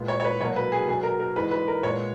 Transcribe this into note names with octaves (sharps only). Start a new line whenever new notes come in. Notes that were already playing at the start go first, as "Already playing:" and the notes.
Already playing: A#2 G#3 B3
C#5
C#5
B4
B2 F#3 A#3 C#5
B4
G#4
B2 F#3 B3 G#4
A#4
A#4
G#2 E3 G#3 B4
B4
A#4
A#2 G#3 B3 C#5